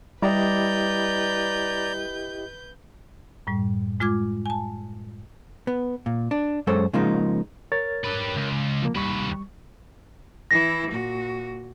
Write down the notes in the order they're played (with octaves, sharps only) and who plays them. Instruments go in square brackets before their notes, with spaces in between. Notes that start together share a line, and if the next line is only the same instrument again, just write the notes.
[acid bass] G3 [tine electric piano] E4 G4 D#5 [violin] B4 G6 [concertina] D5 A#5
[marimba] F#2 A2 G3
A2 G#3 F4 D6 G#6
G#5 A5
[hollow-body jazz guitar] B3
A#2
D4
F#2 G#3 A4 C5 C#5
C#3 F3 G#3 A#3 D#4
[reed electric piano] A#4 C#5 A6
[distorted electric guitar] G4 B4
C#2
[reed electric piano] F3 A#3
[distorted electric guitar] D#2 B4 [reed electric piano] G3 C#6
[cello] E3 E4 [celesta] A#6
[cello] A#2 F#4